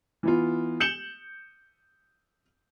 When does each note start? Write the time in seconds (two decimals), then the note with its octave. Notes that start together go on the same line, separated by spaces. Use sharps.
0.23 E3 B3 F4
0.80 G6 C#7 E7 F#7 G7